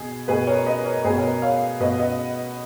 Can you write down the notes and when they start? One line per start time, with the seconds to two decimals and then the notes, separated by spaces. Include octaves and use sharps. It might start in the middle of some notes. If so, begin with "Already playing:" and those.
Already playing: B2 G#4
0.28 B2 G#4 B4
0.47 A#4 C#5
0.67 B4 D#5
0.85 A#4 C#5
1.05 B2 G#4 B4
1.17 A#4 C#5
1.42 C#5 F5
1.80 B2 B4 D#5
2.00 D#5 F#5